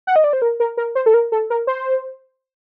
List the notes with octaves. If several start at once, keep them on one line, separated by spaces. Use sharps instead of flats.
F#5
D#5
D5
C5
A#4
A#4
A#4
C5
A4
A#4
A4
A#4
C5